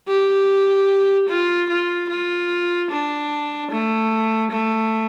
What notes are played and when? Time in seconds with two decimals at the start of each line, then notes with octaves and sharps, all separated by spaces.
0.08 G4
1.29 F4
1.70 F4
2.09 F4
2.91 D4
3.71 A3
4.51 A3